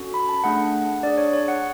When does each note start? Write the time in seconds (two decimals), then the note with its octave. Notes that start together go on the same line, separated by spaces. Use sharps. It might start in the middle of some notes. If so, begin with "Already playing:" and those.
Already playing: C#4 F#4 A4
0.14 B5
0.29 A5
0.44 A3 D4 G#4 F#5
1.03 D4 G#4 D5
1.18 C#5
1.33 C#5
1.48 F#5